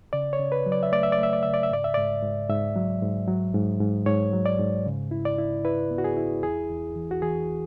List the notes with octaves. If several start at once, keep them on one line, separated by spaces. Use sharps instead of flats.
C#3 D5
C#5
C#3
B4
F#3
D5
E5
A3 D5
E5
D5
A3 E5
D5
C#3 E5
D5
E5
G#2 D5
E5
G#2 D5
G#2
G#2 E5
F#3
G#2
F#3
G#2
G#2
G#2 C#5
F#3
D5
G#2
C#3
E4
D5
E4
E4 B4
B3
F#4
G#4
E4
E2 G#4
E2
E3
F#4
E3 G#4